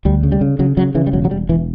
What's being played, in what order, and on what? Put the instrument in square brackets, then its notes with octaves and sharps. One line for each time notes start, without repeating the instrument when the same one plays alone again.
[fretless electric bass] D2 G3
C#3
G3
C#3
C#3 F#3
C#3 F#3
C#3 E3
G3
E1 F#3
F#3
E1 G3
E1 E3